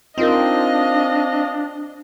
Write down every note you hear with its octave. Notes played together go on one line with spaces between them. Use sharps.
C4 D4 D#4 F4 A#4 D#5 F5